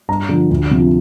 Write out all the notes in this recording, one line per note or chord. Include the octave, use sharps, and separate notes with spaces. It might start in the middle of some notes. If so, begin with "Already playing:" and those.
G2 A#5
D3 F3
D2
C3 F3